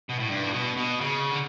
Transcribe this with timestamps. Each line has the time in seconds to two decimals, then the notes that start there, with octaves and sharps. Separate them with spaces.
0.09 B2
0.19 A2
0.29 G2
0.43 A2
0.52 B2
0.77 B2
1.01 C#3
1.31 D3